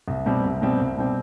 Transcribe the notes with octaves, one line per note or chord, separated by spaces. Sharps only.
C2
B2 G3 C4
C2
B2 G3 C4
C2
B2 G3 C4